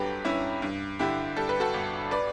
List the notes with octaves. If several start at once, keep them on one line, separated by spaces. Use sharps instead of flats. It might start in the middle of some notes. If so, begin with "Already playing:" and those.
Already playing: G1 G2 F#3 G4 A4 B4
G2 C#4 E4
G2
D3 E4 G4
G3 A4
B4
F#4 A4
G1
B4 D5